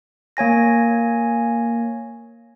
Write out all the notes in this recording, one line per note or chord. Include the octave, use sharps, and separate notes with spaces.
A#3 C#5 G#5 A#6